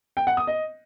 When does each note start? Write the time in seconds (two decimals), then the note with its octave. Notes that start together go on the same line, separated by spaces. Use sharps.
0.17 G5
0.27 F#5
0.37 D#6
0.47 D#5